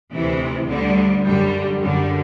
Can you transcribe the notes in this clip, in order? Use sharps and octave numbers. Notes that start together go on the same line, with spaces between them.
D2 C3 E3
D2 D3 G3
F#2 D3 G3
F#2 D3 G3